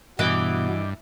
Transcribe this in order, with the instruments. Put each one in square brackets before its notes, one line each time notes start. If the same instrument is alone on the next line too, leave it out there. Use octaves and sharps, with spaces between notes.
[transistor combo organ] G2 [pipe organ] B2 B3 [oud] E3 [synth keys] D#5 D6 G6